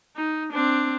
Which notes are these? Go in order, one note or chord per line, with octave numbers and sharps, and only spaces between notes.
D#4
C4 D4